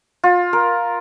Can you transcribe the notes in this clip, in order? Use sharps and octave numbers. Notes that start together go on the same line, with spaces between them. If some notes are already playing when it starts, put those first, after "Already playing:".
F4
A#4